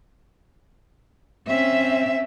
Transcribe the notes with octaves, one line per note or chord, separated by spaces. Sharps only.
C4 C#4 E5